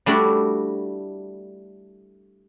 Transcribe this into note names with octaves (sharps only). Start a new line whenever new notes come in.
G3 A3 D4 E4 F#4